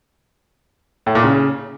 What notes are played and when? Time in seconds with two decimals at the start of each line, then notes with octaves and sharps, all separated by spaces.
1.06 A2
1.15 A#2
1.24 C#3